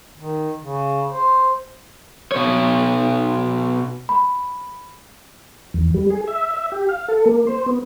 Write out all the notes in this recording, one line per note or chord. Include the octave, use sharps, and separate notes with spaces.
D#3
C#3
C5
B2 C#5
B5
E2
G3
G#4
E5
E5
G4
F5
A4
A#3
C5
B3